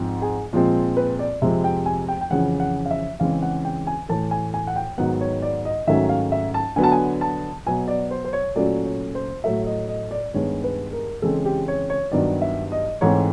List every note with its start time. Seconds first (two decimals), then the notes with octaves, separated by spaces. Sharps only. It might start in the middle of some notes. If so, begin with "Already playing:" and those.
Already playing: G#2 F3 G#3 C4
0.22 G#4
0.53 A#2 F3 G#3 C4
0.97 B4
1.19 D5
1.42 F2 C3 F3 G#3 C4 E5
1.64 G5
1.86 G#5
2.08 G5
2.21 G5
2.30 F2 C#3 E3 F#5
2.60 F#5
2.86 F5
2.91 E5
3.20 C#3 E3 G#3 C4 F5
3.42 F#5
3.65 G5
3.87 G#5
4.09 A2 E3 A3 A5
4.31 G#5
4.54 G#5
4.67 F#5
4.76 G5
4.98 G#2 D#3 F#3 B3 F#5
5.21 C#5
5.42 D5
5.65 D#5
5.87 G#2 D#3 F#3 A3 C#4 E5
6.09 F5
6.32 E5
6.54 A5
6.76 D3 F#3 B3 G#5
6.84 A5
6.92 G#5
7.21 A5
7.66 B2 F#3 B3 G#5
7.88 D5
8.11 C5
8.25 C5
8.33 C#5
8.56 A#2 F#3 A3 C#4 D5
8.85 C#5
9.15 C5
9.44 A2 F#3 A3 E5
9.66 D#5
9.88 D#5
10.11 D5
10.34 G2 D#3 G#3 B3 C#5
10.64 B4
10.93 A#4
11.22 C#3 E3 G#3 C4 A4
11.45 G4
11.68 C#5
11.90 C#5
12.12 G2 D#3 F#3 B3 D5
12.42 E5
12.72 D#5
13.01 G#2 E3 A3 C4 C#5